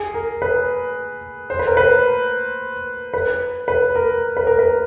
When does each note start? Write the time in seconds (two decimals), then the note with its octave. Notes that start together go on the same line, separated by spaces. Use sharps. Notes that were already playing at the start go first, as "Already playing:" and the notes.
Already playing: G#4
0.14 A#4
0.42 B4
1.50 C5
1.59 B4
1.67 A#4
1.77 B4
3.14 B4
3.68 B4
3.95 A#4
4.37 B4
4.47 A#4
4.59 B4